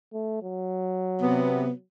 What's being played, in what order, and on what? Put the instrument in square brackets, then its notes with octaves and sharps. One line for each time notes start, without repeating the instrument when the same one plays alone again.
[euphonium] A3
F#3
[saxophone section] C3 B3